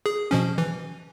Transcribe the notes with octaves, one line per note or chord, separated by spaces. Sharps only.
G#4
B2 F3 C#4
E3